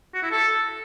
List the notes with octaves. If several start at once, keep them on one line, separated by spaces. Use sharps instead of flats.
F#4
E4
A4